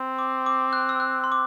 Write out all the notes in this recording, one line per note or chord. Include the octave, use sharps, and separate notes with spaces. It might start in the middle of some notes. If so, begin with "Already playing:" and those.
Already playing: C4
D6
D6
F#6
E6
F#6
C6
D6